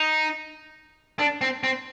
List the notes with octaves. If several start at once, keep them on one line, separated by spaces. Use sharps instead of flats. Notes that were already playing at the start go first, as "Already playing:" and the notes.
Already playing: D#4
D4
C4
C4